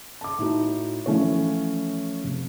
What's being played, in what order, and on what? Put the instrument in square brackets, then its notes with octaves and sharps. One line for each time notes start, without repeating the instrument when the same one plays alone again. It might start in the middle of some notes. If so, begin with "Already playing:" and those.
[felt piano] A5 D6
A2 D#4 F#4
E3 F3 A3 C#4 E4 C#5
F1